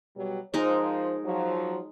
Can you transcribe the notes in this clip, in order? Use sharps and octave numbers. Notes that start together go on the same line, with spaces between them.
B2 F#3 G3
F3 G#3 D#4 A#4 C5
F3 F#3